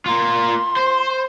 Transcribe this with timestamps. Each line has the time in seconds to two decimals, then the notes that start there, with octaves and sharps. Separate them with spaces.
0.06 A#3 F4 C6
0.77 C5